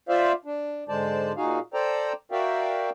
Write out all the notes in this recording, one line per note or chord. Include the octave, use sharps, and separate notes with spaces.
F4 C5 D5 E5 F5
D4
G#2 D3 G#3 C5 D5 A5
A#2 D#4 F#4 G#4 F5
A4 C5 D5 G5 A#5
F#4 A#4 D5 E5 F5 G5